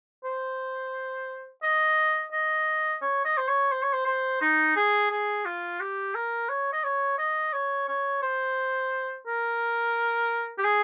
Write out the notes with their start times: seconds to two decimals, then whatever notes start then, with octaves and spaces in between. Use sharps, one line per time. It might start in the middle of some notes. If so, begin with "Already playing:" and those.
0.24 C5
1.63 D#5
2.32 D#5
3.02 C#5
3.25 D#5
3.38 C5
3.48 C#5
3.72 C5
3.83 C#5
3.93 C5
4.06 C5
4.41 D#4
4.76 G#4
5.11 G#4
5.46 F4
5.80 G4
6.15 A#4
6.49 C#5
6.73 D#5
6.84 C#5
7.18 D#5
7.53 C#5
7.88 C#5
8.22 C5
9.27 A#4
10.58 G4
10.65 G#4